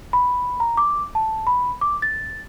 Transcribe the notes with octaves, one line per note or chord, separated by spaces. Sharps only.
B5
A#5
D6
A5
B5
D6
A6